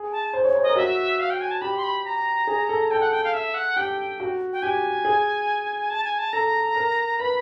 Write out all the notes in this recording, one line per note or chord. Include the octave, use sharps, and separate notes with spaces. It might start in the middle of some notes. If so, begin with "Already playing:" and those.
Already playing: G#4
A5
C5
C#5
C5
A#4 D#5
F#4 E5
F5
G5
G#5
A5
G4 B5
C6
B5
A#5
G#4
A4
A4 G5
F#5
G5
F5
E5
F#5
G4 G5
F#4
G5
G4 G#5
G#4
A5
G#5
A5
A4 A#5
A#4
B4 B5